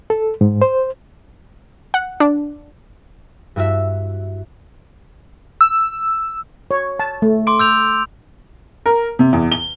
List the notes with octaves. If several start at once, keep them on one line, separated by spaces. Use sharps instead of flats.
A4
G#2
C5
F#5
D4
G2 E4 F#4 E5
E6
C#5
A5
A3
C6 D6 D7
E6 G6 F7
A#4
C3
E2
G7